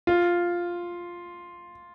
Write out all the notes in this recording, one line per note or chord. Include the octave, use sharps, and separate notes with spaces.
F4